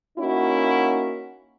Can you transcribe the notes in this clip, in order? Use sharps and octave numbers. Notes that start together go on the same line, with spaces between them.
A#3 C#4 D#4 E4 F#4